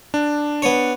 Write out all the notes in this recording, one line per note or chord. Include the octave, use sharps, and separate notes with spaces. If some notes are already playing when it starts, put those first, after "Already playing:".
D4
B3 C#5